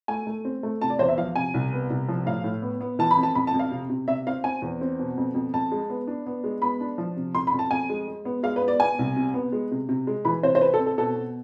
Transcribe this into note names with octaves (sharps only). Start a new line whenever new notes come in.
A3 G#5
A3
C4
A3
C3 A5
D5
E2 C5
E5
F3 F5
C3 G#5
C2
B3
C2
F3
A2 F5
A2
B3
B3
E3 A5
B5
F2
A5
F2 B5
A5
F2
F5
C3
C3
C3 E5
C4 F5
C4 G#5
E2
C4
B2
F2
F2
F2 A5
G#3
B3
D4
B3
G#3
B3 B5
D4
F3
C3
F2 C6
B5
F2
A5
F2 G#5
G#3
G#3
B3
G#3 F5
B4
B3
D5
B3 G#5
C2
C3
B3
G#3
C3
C3
G#3
E3 B5
C3 C5
C5
C4 B4
A4
C4
A4
B2 A4
B2